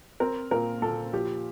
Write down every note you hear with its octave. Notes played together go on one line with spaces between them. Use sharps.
C4 A#4
A#2 A#4
A#2 A4
F3 G4